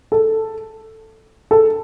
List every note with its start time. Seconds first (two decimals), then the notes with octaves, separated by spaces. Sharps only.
0.12 A4
1.51 A4